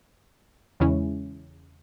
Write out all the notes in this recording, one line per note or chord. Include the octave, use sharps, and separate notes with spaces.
E2 C#3 G#3 C#4 E4